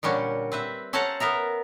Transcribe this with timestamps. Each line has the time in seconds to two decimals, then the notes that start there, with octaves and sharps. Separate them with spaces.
0.03 A#2 D3 G3 C#4 F#4
0.52 C4 B4 E5
0.93 C#4 A4 C5 F#5 A5 A#5
1.20 B3 A#4 E5 A#5